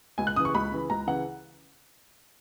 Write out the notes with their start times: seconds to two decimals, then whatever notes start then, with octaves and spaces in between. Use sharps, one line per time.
0.18 C#2 G#5
0.27 F#6
0.36 C#3 E3 D#6
0.45 C#6
0.55 C#2 B5
0.71 C#3 E3
0.90 C#2 A#5
1.07 C#3 E3 F#5